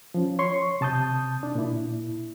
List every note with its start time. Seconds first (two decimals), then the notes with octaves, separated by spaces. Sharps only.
0.14 F3 C#4
0.39 C#5 C6 C#6
0.81 C3 A5 D#6 G6
1.43 D4
1.55 A#2 E4